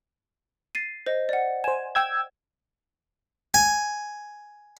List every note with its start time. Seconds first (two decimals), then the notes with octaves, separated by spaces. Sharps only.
0.75 A6 C7 D#7
1.06 C5 D#5
1.29 D5 F#5
1.64 C5 G#5 E7
1.95 G5 E6 G#6
3.54 G#5